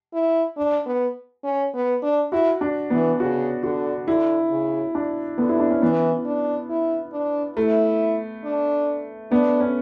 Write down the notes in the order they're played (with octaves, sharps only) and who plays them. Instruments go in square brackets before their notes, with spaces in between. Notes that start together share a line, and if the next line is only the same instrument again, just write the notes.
[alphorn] E4
D4
B3
C#4
B3
D4
[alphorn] E4 [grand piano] F#4
[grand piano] D4
[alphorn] E3 [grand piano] B3
[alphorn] C#3 [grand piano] F#4
[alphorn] D3 [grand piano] F#4
[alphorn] D3 [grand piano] E4
[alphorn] C#3
[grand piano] D4
[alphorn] D3 [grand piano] B3
[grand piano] E4
D4
C#4
[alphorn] E3 [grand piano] B3
[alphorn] D4
E4
D4
[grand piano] A3 [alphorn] E4
[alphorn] D4
[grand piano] B3 [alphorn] D4
[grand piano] C#4